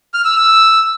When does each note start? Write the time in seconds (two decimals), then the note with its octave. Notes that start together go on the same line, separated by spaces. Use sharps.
0.14 F6
0.25 E6
0.36 E6